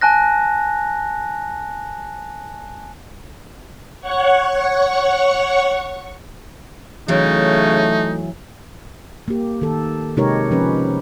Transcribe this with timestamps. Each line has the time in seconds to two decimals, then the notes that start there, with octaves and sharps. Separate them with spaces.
0.01 G#5 A5 F#6 A#6
4.01 C#5 F#5 C#6
7.08 C#3 E3 F#3 A3 D#4
9.28 A#3 G4
9.62 D#3 A4
10.17 C3 G#3 D#4 G4 A#4 C#5
10.51 F3 C#4 B4